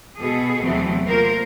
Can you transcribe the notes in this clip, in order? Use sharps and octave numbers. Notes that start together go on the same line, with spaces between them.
B2 G#4 A4
E2 C3 E3 F#3 A3 C4
A#3 F4 A#4 C5